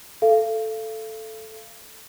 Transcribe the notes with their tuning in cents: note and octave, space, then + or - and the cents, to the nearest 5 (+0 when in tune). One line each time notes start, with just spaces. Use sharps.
A4 +0 F5 -35